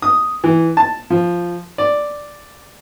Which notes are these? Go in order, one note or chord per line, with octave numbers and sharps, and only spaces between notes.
D#6
E3
A5
F3
D5